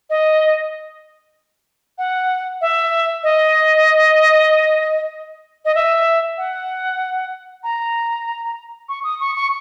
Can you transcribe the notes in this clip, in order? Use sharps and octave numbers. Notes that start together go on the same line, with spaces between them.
D#5
F#5
E5
D#5
D#5
E5
F#5
A#5
C#6
D#6
C#6
C#6